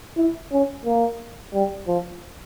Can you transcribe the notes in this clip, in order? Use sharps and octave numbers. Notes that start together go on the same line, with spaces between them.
E4
C#4
A#3
G3
F3